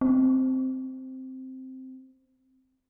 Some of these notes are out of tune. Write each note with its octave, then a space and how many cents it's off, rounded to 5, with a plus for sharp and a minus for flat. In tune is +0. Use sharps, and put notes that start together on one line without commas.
C4 -5